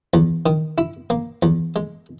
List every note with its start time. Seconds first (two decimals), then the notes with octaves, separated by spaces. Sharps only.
0.14 E2
0.46 D#3
0.78 E4
1.10 A#3
1.43 E2
1.76 G#3